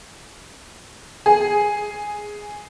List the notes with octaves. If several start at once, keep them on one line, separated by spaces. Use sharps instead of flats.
G#4